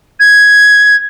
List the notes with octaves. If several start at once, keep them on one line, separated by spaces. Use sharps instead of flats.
G#6